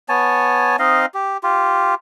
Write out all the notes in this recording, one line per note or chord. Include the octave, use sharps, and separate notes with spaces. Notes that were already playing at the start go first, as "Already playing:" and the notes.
B3 C#5 G#5 A5
C4 D#4 D#5 F5
G4
F4 G4